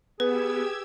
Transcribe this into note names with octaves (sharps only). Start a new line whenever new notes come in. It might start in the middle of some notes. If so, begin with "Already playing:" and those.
B3 G4 G#4 B4 E6 G#6